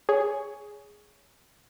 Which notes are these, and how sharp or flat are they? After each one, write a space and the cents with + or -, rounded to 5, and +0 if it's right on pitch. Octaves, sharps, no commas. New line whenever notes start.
G#4 +0 C#5 +15